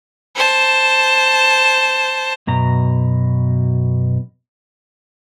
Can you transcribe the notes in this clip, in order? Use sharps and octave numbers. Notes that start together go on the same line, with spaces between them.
C5 A5
F#2 B2 A#5